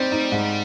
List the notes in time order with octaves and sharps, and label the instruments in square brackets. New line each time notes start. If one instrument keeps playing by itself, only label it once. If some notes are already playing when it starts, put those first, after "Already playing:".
Already playing: [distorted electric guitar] G3 [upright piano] C4 D#4
[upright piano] D#4
G#2